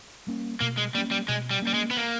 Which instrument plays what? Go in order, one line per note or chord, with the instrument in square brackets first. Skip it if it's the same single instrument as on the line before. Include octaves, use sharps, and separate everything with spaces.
[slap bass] G3 A#3 C#4
[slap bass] B2 [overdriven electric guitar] A#3
[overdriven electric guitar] G#3
[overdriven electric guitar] G3 [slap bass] A#3
[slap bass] C#4
[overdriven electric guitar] G3
[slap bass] B2 [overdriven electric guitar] G#3
[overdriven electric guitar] G3
[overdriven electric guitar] G3 [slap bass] A#3 C#4
[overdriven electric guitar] G#3
B3
A#3